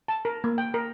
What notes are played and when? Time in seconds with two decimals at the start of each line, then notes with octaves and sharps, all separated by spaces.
0.08 A5
0.25 A#4
0.44 A#3
0.58 G5
0.74 A#4